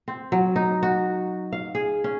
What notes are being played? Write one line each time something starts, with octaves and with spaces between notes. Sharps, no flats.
C4
F#3
D#4
F#4
F5
G#4
C#4